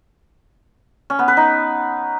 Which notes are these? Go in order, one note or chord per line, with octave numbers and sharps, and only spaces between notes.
C#4
B3
B4
D#4